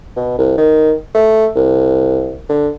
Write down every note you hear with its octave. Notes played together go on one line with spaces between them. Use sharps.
B2
C2
D#3
A3
C2
D3